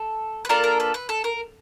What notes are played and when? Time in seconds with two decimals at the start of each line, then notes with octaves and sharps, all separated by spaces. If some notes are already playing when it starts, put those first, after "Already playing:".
Already playing: A4
0.45 B4
0.49 A#3 D4 F4 A4 A#4
0.64 A#4
0.80 B4
0.94 B4
1.09 A4
1.24 A#4